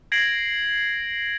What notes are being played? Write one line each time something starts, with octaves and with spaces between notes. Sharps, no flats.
G#6 A#6 C7 D7 F#7